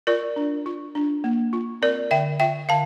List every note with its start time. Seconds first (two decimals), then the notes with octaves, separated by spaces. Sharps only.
0.07 F4 A#4 D5
0.36 D4
0.66 F4
0.95 D4
1.24 A#3
1.53 F4
1.82 C4 A#4 D5
2.11 D3 E5 G5
2.40 F4 E5 G5
2.69 D3 F5 A5